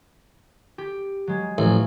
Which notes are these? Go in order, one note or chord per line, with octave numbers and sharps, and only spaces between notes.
G4
F#3 G#3
A1 E3 F3 A3